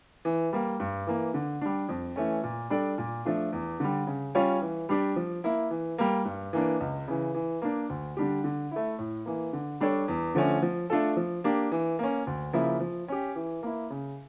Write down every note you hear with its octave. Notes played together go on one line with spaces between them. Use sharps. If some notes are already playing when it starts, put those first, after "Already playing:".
E3
G3 A#3
G2
E3 A#3
D3
G3 D4
F2
E3 A3 C#4
A#2
G3 D4 A4 D5
A#2
F3 A3 D4 F4
E2
D3 G3
C#3
G3 C#4 F4 C#5
E3
G3 D4 G4
F3
A#3 E4
E3
G3 A#3
G2
E3 A#3 D4
C#2
C#3 E3
E3
A#3 D4
D2
D3 G3 D4 G4
D3
A3 E4
A2
E3 A#3
D3
G3 D4 A4 C#5
E2
D3 F3 A3 C#4
F3
A3 D4 F4 A4
F3
A#3 D4 G4
E3
A#3 C#4
D2
C#3 F3 A#3 E4
F3
C#4 G4
E3
A#3 E4
C#3